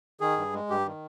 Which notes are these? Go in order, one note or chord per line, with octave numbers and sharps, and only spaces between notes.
D#3 G#4
G2
G#3
G2 G4
D#3